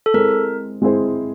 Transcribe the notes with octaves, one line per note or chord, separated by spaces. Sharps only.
A4
G#3 C4 E4 G#4 A#4 C5
G#3 C4 E4 G#4 C5